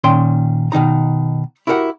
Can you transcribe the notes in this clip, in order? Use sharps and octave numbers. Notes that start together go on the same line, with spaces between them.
A#2 D#3 C#4 G5 C6
B2 D#3 D#4 A#5
E4 F#4 G4 A#4 F#5